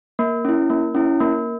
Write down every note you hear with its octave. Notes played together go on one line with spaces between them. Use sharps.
A#3
C#4 E4
A#3
C#4 E4
A#3